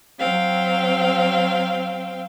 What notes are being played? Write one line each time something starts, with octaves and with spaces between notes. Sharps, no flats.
F#3 C4 F5 G5